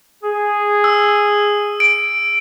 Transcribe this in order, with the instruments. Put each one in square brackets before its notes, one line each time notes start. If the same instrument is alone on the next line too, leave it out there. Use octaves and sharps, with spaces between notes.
[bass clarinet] G#4
[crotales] E6
D7